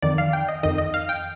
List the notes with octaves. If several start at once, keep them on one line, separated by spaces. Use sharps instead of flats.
F2 D#3 D5
F5
G5
D#5
F2 D#3 D#5
D#5
F5
G5